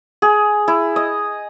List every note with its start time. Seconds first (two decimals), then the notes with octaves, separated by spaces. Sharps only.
0.22 G#4
0.68 E4
0.96 D#5